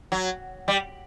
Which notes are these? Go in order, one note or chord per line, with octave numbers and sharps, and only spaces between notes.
F#3
G3